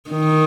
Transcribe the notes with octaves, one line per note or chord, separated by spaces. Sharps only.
D#3